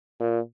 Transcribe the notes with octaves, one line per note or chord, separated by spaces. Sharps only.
A#2